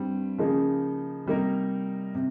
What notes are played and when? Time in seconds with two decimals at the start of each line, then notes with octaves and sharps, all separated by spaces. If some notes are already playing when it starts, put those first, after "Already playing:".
Already playing: G2 G3 C4
0.38 C#3 F3 A#3 D#4 G#4
1.26 C3 G3 A#3 D#4 A#4
2.15 C3